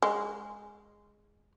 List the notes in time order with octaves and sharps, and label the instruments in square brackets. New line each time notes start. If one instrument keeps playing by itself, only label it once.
[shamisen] G#3